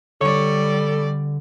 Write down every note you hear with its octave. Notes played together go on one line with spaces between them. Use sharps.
D3 G3 A4 C#5 D5